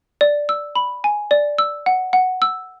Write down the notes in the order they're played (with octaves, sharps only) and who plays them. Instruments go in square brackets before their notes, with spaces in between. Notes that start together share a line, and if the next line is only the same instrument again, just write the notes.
[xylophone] D5
E6
B5
G#5
D5
E6
F#5
F#5
E6